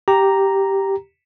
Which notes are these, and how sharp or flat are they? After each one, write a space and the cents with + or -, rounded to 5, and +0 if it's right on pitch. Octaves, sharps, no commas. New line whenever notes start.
G4 -5 A#5 +0